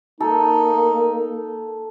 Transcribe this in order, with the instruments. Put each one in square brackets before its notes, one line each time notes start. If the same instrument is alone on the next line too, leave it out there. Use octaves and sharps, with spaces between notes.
[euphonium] A#3 [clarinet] D#4 [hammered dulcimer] A4